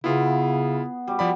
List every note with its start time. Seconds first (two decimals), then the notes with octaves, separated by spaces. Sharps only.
0.04 C#3 B3 E4 F4 G#4
1.07 G3 F#4
1.19 F3 D5 B5